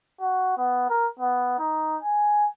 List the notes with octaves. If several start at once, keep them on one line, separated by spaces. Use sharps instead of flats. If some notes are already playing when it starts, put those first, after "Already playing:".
F#4
B3
A#4
B3
D#4
G#5